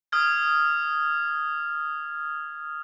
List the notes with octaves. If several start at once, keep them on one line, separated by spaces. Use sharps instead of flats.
D#6 F6 G#6